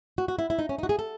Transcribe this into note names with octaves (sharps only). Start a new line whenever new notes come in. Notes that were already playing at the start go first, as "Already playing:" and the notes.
F#4
F#4
E4
E4
D#4
C#4
D#4
F#4
G#4
A4